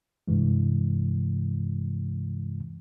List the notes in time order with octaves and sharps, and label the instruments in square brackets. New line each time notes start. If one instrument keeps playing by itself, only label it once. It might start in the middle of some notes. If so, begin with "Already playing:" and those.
[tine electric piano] G2 C3 E3 G#3